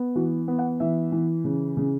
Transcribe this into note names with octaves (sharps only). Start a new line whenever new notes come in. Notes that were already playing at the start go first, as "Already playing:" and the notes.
Already playing: B3
E3 F#4
B3
F#5
E3 E5
E3
C#3
C#3